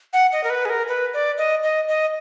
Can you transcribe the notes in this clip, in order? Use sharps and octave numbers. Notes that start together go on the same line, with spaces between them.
F#5
D#5
A#4
B4
G#4
A#4
B4
D5
D#5
D#5
D#5